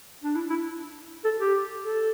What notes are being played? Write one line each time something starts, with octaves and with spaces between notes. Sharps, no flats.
D4
E4
E4
A4
G4
A4